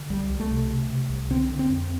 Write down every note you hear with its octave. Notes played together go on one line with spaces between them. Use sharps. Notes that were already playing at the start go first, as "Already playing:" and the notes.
Already playing: D3
C2 G3
C2
A3
C3
C3
C3
C2
D3 C4
D3
C4
F2